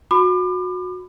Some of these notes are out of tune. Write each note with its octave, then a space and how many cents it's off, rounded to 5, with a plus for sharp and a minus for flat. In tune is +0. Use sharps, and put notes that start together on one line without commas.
F#4 -25 B5 +25 D6 +35